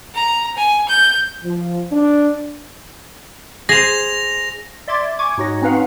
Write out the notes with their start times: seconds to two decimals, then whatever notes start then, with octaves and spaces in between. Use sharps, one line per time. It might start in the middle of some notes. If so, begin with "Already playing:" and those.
0.14 A#5
0.57 G#5
0.89 G6
1.44 F3
1.92 D4
3.69 G#4 C5 A#6 F7
4.88 D5 E5 C6 D6 G#6 A6
5.19 G#5 C#6 D6 G#6
5.37 G#2 D#4 F#4 C#5 A#6
5.61 C4 C#4 D#4 B4 F5 F#5